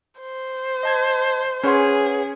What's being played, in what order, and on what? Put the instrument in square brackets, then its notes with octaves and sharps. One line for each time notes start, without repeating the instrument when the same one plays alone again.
[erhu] C5
[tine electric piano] D#5 A5 G#6
[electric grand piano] C#4 C6 [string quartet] G#4 [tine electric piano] B4 C#5 F#5